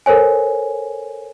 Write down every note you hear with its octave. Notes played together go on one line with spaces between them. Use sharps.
A4 A#4 C5 C#5 G#5